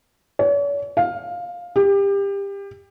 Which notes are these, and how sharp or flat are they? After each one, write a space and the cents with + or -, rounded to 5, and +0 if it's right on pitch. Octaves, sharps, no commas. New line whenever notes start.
C#5 +45
F5 +10
G4 +25